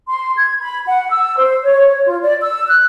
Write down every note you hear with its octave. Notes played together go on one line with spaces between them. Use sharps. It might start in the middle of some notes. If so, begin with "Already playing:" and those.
C6
G#6
B5
F#5
E6
C5
C#5
F4
D5
E6
F#6